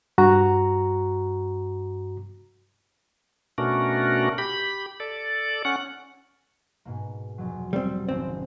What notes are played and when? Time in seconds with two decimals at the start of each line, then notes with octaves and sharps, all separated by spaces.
0.18 G2 F#4 A#5
3.58 B2 A3 C#4 D4 F#4 A#4
4.38 G4 B5
5.00 A4 D5
5.65 C#4 F#5
6.85 G#2 B2 A#3
7.38 F1 F#3
7.73 G3 C4
8.09 G#1 C4 C#4 C6